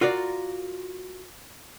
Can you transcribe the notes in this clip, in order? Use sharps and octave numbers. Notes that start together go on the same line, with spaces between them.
F4 F#4 A#4 D5